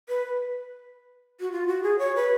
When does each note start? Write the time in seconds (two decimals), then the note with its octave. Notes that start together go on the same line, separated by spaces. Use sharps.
0.09 B4
1.40 F#4
1.52 F4
1.68 F#4
1.83 G#4
1.99 C#5
2.16 B4